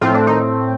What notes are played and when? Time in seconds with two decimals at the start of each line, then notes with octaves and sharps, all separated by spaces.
0.01 A2 F3 A3 C4 F4
0.14 D4
0.27 D#3 D#4